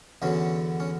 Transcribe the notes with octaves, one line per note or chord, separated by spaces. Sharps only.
E2 D3 F#3 C#4
C#4